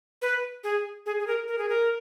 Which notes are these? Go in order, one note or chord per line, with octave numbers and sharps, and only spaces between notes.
B4
G#4
G#4
G#4
A#4
A#4
G#4
A#4